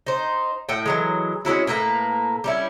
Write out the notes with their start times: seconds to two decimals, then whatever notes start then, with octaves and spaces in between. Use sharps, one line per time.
0.06 D#4 C5
0.69 A2 F#5 G5
0.86 E3 F#3 G#3
1.45 G#3 C#4 E4 F#4
1.67 A2 A#3 B4 A#5
2.44 G3 C#4 E4